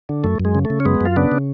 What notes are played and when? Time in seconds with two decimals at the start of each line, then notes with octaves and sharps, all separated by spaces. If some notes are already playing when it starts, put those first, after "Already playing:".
0.09 D3
0.24 F#2 A3
0.40 F#2
0.45 G#3
0.55 C#3
0.65 A3
0.70 C#3
0.80 C#4
0.85 F#2 G#3 B3
1.01 F#2 F4
1.16 C#3 B3 D4
1.32 C#3